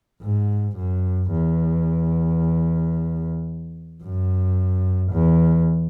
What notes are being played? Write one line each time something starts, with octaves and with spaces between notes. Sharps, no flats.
G#2
F#2
E2
F#2
E2